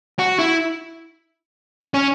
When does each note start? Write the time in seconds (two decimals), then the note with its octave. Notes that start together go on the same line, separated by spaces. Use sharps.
0.19 F#4
0.39 E4
1.94 C#4